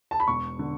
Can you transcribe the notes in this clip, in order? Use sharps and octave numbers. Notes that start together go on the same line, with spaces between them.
A5
B5
E1 C#6
D3